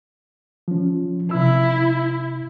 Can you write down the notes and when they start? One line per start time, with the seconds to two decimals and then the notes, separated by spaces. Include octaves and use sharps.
0.68 F3 C#4
1.31 C3 E4 E6